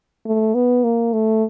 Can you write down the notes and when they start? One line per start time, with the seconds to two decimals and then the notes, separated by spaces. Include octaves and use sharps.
0.25 A3
0.54 B3
0.84 A#3
1.13 A3